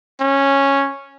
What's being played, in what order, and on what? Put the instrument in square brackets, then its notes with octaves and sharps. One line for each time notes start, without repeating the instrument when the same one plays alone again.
[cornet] C#4